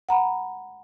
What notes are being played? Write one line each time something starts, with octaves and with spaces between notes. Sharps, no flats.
F#5 A#5 B5